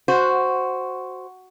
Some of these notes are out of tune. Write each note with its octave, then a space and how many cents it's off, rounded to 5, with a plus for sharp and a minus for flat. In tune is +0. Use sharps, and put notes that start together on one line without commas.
F#4 +0 C5 +0